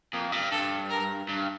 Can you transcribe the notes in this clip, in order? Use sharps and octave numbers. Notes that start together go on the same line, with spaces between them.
F2 A#3
G2
G2 A4
A#4
G2